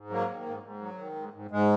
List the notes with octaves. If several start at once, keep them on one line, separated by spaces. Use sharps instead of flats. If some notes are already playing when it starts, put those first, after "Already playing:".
Already playing: G#2
F#3 A#3
D#3
G#2
G#2
F#3
D#3
G#2
G#2
G#2 G#3